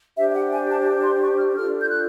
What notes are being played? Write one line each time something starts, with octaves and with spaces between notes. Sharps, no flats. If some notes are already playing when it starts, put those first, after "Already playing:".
D4 G4 C5 E5
F#5
G#5
A5
C6
C#6
F6
D4 F4 A4 F6
G6
F#6